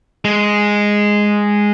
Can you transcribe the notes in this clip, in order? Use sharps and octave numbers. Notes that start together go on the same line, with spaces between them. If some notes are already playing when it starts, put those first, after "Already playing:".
G#3